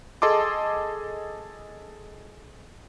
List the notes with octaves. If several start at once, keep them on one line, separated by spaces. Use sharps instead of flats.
G#4 A4 D#5 A5 C6 D6